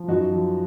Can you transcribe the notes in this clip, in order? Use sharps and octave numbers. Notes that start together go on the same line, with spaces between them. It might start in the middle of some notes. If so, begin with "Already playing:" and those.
Already playing: F3
F#2 D#4 F#4
F3